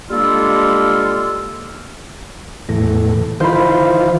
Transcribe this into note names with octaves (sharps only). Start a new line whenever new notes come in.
G3 G#3 A#3 D4 F4 A4
E2 A2 A#6
D#3 E3 F4 C5 B5